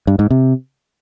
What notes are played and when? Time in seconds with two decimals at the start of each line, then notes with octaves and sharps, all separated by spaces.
0.07 G2
0.19 G#2
0.30 C3